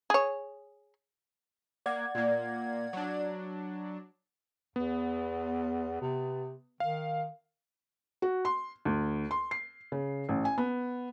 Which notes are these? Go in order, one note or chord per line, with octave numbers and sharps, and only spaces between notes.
G#4 C#5
A#3 D5 F#5 G#6
A#2 A#3
F#3 D4
E2 B3
C3
D#3 F5
F#4
C6
D2
C6
C7
C#3
A1
G#5
B3